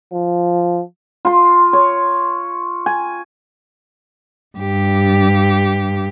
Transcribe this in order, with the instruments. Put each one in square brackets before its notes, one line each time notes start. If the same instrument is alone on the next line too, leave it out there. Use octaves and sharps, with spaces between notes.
[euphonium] F3
[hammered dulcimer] F4 C6
C#5
G#5
[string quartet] G2 G4